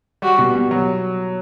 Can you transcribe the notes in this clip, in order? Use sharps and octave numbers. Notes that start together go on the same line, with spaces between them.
G3 F#4
B2
B2
F#3